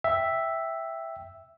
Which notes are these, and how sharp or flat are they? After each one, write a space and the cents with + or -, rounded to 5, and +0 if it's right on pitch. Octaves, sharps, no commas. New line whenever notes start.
E5 +0 G5 +0